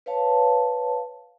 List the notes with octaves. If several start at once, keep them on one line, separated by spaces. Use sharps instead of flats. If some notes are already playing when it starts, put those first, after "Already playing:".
B4 C#5 F5 A5